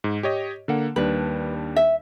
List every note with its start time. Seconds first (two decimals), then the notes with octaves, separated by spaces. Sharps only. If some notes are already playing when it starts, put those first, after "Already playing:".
0.04 G#2
0.23 G4 C#5 D#5
0.68 D3 A#3 F#5
0.96 D#2 G3 D4 B4
1.76 E5